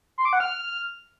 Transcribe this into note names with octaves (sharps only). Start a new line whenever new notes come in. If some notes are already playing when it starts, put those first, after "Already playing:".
C6
D6
F#5
F6